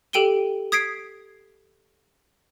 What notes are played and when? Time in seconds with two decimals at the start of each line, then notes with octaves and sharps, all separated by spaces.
0.13 G4 A4 G5 D7 D#7 G7
0.72 D#6 G#6 B6 C7 D7